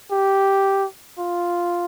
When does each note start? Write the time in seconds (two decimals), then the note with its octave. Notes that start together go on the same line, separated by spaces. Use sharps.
0.11 G4
1.18 F4